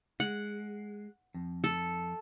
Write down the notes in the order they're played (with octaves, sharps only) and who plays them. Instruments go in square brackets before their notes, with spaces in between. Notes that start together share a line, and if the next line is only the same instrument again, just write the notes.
[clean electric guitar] G#3 [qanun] F#5
[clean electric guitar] F2
[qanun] A4